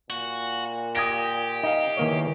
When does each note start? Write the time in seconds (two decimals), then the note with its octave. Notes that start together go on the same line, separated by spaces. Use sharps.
0.10 A#2 F#4
0.96 G4 D#6 G#6 A#6
1.64 D#4 D#5 F5
1.97 E2 D#3 A#3 C#5